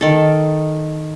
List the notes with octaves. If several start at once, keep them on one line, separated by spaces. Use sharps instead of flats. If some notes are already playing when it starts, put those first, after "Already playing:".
D#3 A4